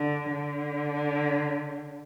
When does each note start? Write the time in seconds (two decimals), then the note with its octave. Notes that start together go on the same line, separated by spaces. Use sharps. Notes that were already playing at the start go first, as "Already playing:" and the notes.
Already playing: D3
0.31 D3